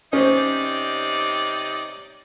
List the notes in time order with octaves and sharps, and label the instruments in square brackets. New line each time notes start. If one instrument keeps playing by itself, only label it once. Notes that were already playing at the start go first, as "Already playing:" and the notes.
[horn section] C3 D#4 D5 [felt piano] C#4 C5